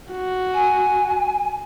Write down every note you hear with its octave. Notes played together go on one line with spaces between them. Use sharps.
F#4
G#5